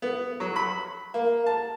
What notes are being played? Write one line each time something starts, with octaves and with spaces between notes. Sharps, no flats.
B3
F#3
B5
A#3
A5